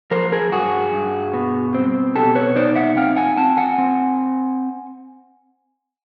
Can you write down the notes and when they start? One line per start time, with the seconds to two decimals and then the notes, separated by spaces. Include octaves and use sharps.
0.11 F3 A#4 C5
0.32 G#4 A#4
0.52 G2 F#4 G#4
0.93 G2
1.34 B2
1.74 C4
2.15 B2 G4 A4
2.35 B4 C#5
2.56 D#4 C5 D5
2.75 E5 F#5
2.97 C4 F5 G5
3.16 F#5 G#5
3.37 C4 G5 A5
3.57 F#5 G#5
3.78 C4